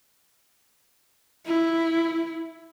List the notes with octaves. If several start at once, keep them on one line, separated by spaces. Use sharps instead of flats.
E4